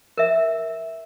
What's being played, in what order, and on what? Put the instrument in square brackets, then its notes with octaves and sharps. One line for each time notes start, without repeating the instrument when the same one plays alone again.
[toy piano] A#4 E5